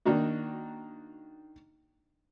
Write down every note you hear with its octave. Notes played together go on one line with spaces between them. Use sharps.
D#3 A#3 D4 D#4 F#4